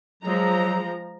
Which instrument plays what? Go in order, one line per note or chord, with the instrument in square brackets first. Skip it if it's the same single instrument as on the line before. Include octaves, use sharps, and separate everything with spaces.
[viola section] F3 G#3 A#5 [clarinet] F#3